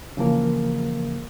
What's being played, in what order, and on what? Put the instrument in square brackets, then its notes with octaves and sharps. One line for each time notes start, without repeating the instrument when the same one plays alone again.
[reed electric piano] C#3 E3 F3 A#3 A#4